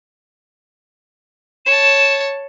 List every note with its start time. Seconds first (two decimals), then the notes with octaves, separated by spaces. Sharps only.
1.66 C#5 A5 E7